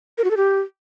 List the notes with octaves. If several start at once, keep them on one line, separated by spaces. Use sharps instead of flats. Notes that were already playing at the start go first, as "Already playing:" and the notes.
A#4
F#4
A4
G4